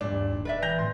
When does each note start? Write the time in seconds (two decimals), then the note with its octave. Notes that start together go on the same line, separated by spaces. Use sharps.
0.01 E2 G2 A#2 D4
0.12 D1 D#2
0.33 D#1 C#4
0.45 B4 D5 E5
0.62 E3 G6 A#6 F7
0.79 E1 A2 E3 F#3 B3 C6